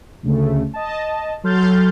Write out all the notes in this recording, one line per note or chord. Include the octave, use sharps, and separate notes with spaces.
D2 C#3 A3
D#5 A5
F#3 A4 C6 F6 G6 A6